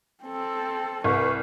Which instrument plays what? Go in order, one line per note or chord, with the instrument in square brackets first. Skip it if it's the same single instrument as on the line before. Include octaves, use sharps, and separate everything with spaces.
[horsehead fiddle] C4 A4
[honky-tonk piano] C2 [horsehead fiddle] B4 [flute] C#6